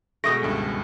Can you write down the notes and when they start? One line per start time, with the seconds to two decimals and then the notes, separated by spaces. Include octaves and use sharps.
0.24 B2 G#3 A3 C#6 D#6 A#6 D7
0.42 G#1 C#2 G2